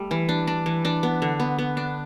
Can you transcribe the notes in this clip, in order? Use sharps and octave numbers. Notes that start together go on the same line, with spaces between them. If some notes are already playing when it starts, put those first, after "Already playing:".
Already playing: G3 A3
E3
D4
D4
E3
D4
B3
D3
B3
B3
D4